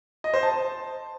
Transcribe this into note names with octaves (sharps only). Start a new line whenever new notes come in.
D#5
C5
A5